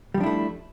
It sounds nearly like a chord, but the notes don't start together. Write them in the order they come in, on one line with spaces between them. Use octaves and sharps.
G3 F3 D4 E4 A3